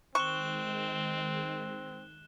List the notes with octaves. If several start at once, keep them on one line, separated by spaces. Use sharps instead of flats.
D#3 G#3 C4 C#6 F#6 E7 G7